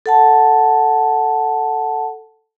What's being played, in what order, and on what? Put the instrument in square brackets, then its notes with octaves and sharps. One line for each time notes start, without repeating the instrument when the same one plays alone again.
[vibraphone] A4 F#5 A5